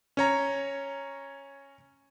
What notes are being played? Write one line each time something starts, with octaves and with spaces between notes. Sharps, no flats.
C#4 C#5 A#5